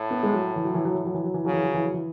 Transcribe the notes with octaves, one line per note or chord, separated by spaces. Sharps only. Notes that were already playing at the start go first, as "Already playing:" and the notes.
Already playing: A2
B3
G#3
F#3
E3
F#3
E3
F#3
E3
F#3
E3
F#3
E3
C#3 F#3
E3
F#3
E3
F#3
E3